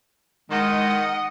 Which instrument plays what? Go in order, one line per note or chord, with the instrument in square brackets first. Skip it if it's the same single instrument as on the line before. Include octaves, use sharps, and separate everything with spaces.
[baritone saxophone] D#3 [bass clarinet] G#3 [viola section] D#5 [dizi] F#5